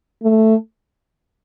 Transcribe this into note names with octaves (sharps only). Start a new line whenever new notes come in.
A3